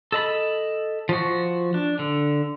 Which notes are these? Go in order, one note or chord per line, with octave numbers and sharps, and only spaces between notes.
A4 D#5 B5
F3 F#4
D4
D3